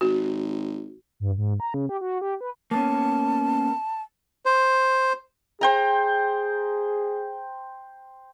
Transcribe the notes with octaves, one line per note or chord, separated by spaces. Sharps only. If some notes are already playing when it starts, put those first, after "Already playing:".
G#1 F#4
G2
G#2
A#5
C#3
G4
F#4
G4
B4
A#3 B3 C#4 A5
C5
G#4 C5 G5 A#5